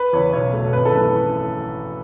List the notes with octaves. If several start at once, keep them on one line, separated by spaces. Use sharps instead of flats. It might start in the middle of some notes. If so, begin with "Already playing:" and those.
Already playing: B4
E2 C#3 C#5
B1 C#5
B2 A3
G#1 B4
A4
F#2 E3 A3 B4